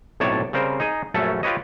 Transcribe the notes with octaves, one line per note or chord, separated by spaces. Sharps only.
B1 A2 C3 C#5 D5 A5
C#3 G3 C4 A#4 C5
D#4 G#4 D#5
A#1 F#2 F#3 A3 C#4 A4
F4 G4 B4 C#5 D#5